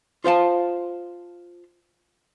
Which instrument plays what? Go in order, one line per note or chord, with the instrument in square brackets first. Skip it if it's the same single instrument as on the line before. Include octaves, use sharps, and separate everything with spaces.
[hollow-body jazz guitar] F4 C5 F5 A5